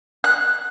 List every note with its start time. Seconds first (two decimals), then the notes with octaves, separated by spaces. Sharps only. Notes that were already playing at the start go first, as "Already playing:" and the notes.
0.24 F#6